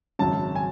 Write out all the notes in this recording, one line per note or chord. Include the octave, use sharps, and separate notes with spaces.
G#1 F#2 C#3 A5
G#5